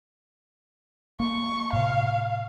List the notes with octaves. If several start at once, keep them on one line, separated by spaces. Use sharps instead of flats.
A#3 C#6
A2 C3 F5